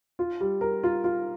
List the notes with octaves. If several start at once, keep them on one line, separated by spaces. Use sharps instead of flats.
F4
G3
A#4
F4
F4